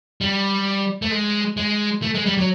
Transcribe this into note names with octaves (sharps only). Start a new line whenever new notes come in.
G3
A3
G#3
G#3
A3
G#3
G3
F#3